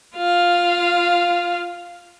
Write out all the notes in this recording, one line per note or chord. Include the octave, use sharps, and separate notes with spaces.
F4 F5